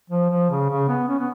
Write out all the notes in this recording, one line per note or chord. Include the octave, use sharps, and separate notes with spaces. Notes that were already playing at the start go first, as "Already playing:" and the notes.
F3
F3
C#3
C#3
B3
C#4
B3